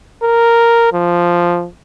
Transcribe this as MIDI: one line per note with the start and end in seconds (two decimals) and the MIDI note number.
0.23 0.88 70
0.93 1.67 53